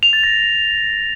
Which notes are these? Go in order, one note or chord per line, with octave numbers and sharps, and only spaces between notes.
F7
A6
A#6